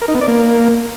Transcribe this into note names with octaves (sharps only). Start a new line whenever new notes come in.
A#4
D#4
B3
D5
A#3